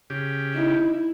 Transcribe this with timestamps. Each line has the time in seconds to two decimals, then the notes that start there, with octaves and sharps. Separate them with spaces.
0.10 C#3 G4
0.54 D#4 E4